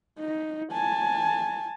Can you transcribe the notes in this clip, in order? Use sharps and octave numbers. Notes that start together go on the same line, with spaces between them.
D#4
G#5 A5